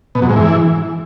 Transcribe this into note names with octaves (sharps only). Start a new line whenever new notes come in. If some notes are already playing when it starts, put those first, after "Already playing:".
B2
F#2
G#2
E3